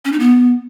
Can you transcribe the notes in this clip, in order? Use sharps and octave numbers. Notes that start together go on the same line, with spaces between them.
C#4
D#4
B3